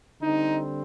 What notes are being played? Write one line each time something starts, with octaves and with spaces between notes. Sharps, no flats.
D3 G3 C4 D#4